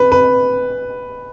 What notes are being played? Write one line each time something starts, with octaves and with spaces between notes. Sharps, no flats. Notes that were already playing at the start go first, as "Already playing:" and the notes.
Already playing: B4
B4